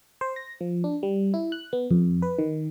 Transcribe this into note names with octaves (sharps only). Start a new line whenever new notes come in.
C5
A#6
F3
D4
G3
E4
F#6
B3
F2
B4
D#3